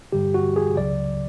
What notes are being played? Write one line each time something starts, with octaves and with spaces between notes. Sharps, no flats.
G2 D3 G3 G4
F#4
G#4
C#2 C#3 F#3 D5